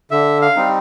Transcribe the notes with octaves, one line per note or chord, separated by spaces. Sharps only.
D3 E5
F5
G3 C4 D#4